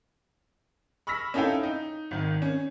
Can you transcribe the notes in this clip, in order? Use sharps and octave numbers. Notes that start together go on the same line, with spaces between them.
B5 C#6 E6 F6 A#6 B6
C#4 D#4 E4 A4 F5 G5
D#4
G#1 D#3
C#4